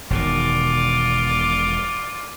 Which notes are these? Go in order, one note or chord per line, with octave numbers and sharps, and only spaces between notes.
E1 B2 D#3 F4 D5 D6